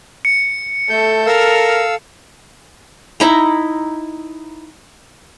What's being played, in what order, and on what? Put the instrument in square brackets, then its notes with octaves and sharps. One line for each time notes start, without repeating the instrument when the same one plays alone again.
[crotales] C#7
[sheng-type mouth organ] A3 G6 [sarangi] A4
[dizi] A#4 [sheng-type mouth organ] F5 E6
[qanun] D#4 E4 A#5